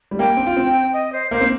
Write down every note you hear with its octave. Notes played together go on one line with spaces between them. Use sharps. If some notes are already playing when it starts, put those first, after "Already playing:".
G3
A#3 G5
C4
F4
C4
D#5
C5
A#3 C5
C4